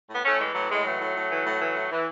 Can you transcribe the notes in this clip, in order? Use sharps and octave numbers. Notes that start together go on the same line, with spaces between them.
A2
B3
A2 A3 C#4
E3 G#3
A2 F#3
A2 G#3
E3 F#3 A3
A2
A2
E3
A2
E3
A2
E3